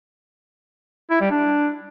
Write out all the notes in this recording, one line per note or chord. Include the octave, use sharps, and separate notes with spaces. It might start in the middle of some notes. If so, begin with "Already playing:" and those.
E4
G3
D4